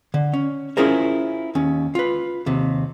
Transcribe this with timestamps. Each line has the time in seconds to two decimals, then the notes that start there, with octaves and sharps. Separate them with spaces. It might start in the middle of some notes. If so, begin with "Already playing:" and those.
0.14 D3
0.33 C#4
0.77 C#4 E4 F4 G#4 A#4 C5
1.55 D#2 C#4
1.95 F4 B4
2.46 D#2 C3